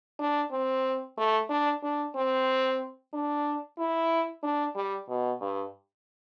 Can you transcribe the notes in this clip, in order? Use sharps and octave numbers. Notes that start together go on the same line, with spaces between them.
D4
C4
A3
D4
D4
C4
D4
E4
D4
G3
B2
G2